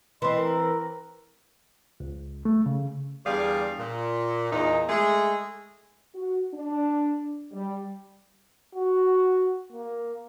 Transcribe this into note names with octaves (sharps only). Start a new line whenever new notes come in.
E3 C4 D#5 C6
A#4
C#2
A3
C#3
E2 D3 G3 G#4 D5 F5
A#2
E2 A#2 D#4
G#3 A3 G#4
F#4
D4
G3
F#4
A#3